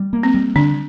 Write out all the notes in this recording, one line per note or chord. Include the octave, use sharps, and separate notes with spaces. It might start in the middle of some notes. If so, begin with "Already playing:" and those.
Already playing: G3
A#3
C4
G3
D3 D4